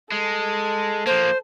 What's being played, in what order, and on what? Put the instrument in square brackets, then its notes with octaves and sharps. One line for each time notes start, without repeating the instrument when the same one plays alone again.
[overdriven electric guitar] G#3 [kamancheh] A4
[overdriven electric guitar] F3 A#3 [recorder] C5